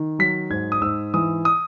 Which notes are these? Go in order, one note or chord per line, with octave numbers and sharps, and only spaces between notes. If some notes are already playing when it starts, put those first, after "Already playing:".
Already playing: D#3
F#3 B6
G#2 G#6
D#6
G#2 E6
E3 D#6
D#6